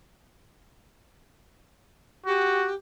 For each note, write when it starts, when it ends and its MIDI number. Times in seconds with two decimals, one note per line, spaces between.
2.26 2.69 66
2.26 2.74 67